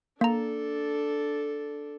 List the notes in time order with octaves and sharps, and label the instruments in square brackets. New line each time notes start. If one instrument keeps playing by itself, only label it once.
[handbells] A#3 A#5 [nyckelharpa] D4 A4